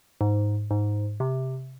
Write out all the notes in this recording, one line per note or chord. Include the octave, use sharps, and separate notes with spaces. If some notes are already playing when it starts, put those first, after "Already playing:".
G#2
G#2
C3